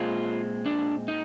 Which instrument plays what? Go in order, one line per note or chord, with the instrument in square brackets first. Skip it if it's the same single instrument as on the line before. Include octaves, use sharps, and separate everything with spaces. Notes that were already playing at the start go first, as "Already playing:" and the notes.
Already playing: [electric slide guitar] A#2 G#3 C4 F4
D4
D#4